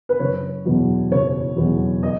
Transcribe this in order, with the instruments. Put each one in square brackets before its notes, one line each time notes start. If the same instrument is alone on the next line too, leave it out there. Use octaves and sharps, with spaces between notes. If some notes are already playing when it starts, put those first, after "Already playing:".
[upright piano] B4
F#1 C#5
E2 B2 F#3 B3
F#1 C#5
E2 B2 F#3 B3
D#5